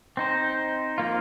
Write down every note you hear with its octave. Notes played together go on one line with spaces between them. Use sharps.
C4 D#4 C5
F3 A#3 F4